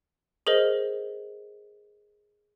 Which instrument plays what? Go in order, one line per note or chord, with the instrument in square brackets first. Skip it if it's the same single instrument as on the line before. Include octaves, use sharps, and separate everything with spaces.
[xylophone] G#4 A#4 C5 D#5